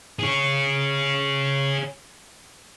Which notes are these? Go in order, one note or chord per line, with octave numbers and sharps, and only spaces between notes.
G#4 C#5